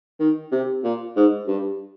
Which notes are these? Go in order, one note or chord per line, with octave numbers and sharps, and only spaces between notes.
D#3
C3
A#2
G#2
G2